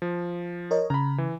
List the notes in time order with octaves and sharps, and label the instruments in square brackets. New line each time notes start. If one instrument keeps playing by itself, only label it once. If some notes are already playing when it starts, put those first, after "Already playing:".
[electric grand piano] F3
[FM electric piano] A#4 C#5 D#5
[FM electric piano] C#3 [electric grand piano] A#5 B5
[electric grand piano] E3